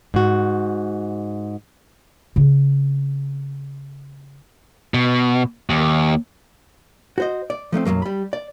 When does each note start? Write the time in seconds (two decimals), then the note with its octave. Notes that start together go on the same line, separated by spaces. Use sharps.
0.14 G#2 F#4
2.36 C#3 C4
4.94 B2
5.70 D#2
7.18 F#4 C5 D#5
7.50 D5
7.72 F3 A3 A#3 C4
7.85 B1 F#2 C3 F#3 A#3
8.02 G3 B5
8.33 D5